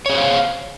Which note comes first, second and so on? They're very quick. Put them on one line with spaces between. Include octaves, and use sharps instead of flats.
C#5 G#4 C5 F5